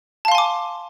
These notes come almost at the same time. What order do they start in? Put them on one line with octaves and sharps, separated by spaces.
A5 F5 C6 G#5 D6